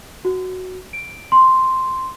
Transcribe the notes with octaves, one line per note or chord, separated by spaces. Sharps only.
F#4
D7
C6